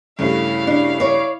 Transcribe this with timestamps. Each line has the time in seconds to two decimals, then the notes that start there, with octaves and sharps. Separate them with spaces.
0.19 G2 C#3 A3 E4 F5
0.67 D4
1.00 C#5 D5